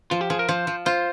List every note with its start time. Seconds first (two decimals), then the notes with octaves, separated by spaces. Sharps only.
0.11 F3 F4
0.21 G4
0.30 F3 G#4
0.39 A#4
0.49 F3 C5
0.67 F3
0.86 F4 C5